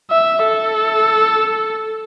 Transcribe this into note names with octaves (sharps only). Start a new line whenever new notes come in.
E5
A4